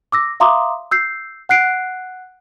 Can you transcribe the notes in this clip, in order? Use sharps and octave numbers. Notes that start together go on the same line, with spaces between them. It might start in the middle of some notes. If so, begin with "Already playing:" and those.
D6 E6 A#6
E5 F5 A#5 C6 D6 D#6
E6 G6 C7
F#5 F#6 C7 D7